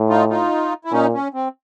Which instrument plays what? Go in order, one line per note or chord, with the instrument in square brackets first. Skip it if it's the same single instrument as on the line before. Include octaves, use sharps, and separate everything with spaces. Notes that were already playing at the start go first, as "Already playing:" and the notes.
Already playing: [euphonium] A2
[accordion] D#4 F4
D#4 F4
E4
[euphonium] A#2 [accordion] C#4 D#4
[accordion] C#4
C4